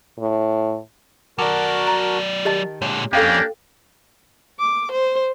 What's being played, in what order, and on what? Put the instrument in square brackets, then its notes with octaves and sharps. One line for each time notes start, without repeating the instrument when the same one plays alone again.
[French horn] A2
[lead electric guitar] F#3 D5 [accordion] F#4 A#4 A5 [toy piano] D6
[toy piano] A#5
[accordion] D#3 [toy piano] G4 D#5 A5
[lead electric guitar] A#2 D3 [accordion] G#3 [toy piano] C#5
[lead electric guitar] F2 [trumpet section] A#3 D4 G4 [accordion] C#4 [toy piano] A4 F5 G5
[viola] D6
C5